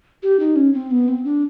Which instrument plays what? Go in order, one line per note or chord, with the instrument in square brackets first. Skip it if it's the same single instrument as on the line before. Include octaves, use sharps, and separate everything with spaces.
[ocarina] G4
D#4
C#4
C4
B3
C4
D4